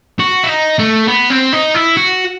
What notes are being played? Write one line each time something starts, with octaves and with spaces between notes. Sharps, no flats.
F#4
E4
D#4
A3
B3
C4
D#4
E4
F#4